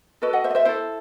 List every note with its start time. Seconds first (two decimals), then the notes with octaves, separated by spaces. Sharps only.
0.22 F#4 A4 B4 D#5
0.33 D#5 F#5
0.44 C5 E5
0.50 D#5
0.55 C5 E5
0.65 E4 A4 C5